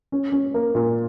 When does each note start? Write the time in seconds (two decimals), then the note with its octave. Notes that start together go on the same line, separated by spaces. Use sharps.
0.12 C#4
0.32 C#4
0.54 A#3
0.75 A#2